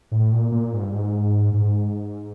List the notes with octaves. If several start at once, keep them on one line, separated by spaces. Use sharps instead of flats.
A2
A#2
A#2
G#2
G2
G#2
G#2